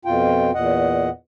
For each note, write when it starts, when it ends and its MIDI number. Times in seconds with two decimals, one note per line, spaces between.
0.05 0.51 41
0.05 0.51 47
0.05 0.51 65
0.05 0.51 79
0.54 1.09 40
0.54 1.09 46
0.54 1.09 75
0.54 1.09 78